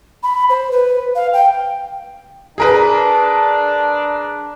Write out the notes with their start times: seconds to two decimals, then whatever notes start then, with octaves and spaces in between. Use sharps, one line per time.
0.23 B5
0.50 C5
0.71 B4
1.15 F5
1.33 G5
2.58 D4 G#4 A#4 B4